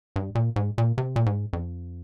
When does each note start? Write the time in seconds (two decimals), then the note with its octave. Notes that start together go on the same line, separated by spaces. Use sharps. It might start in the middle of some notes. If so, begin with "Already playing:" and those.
0.16 G2
0.35 A#2
0.56 G#2
0.78 A#2
0.98 C3
1.16 A#2
1.26 G#2
1.53 F2